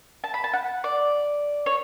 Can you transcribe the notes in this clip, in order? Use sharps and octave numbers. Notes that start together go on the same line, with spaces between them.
A5
B5
A5
F#5
D5
C#5